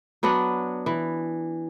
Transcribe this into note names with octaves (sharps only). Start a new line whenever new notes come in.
F#3 B3 D4 F#5
E3